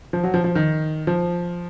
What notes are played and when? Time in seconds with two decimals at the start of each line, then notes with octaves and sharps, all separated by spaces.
0.13 F3
0.24 F#3
0.34 F3
0.44 F3
0.55 D#3
1.07 F3